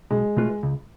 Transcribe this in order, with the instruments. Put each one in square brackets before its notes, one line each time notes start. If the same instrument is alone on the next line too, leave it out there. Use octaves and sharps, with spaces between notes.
[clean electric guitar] B1 [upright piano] G#3
[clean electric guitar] B2 A3 F4 B4
C#2